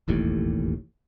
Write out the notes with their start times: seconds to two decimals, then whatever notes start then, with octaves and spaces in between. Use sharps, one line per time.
0.08 E1 A1 D#2 A2